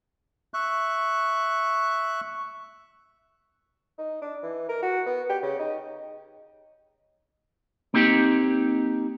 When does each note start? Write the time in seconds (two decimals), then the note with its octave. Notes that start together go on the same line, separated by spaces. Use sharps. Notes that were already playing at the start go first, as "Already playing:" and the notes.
0.54 E5 C#6 F#6
3.98 D#4
4.22 D4
4.43 E3
4.69 A#4
4.83 F#4
5.06 B3
5.29 G4
5.43 C#3
5.59 D#4
7.94 A#3 C4 D#4 G4